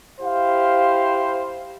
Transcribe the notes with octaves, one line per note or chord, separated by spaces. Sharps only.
E4 G4 C5 F5